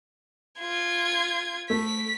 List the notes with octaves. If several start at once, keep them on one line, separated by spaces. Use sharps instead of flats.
F4 G#6
A3 B6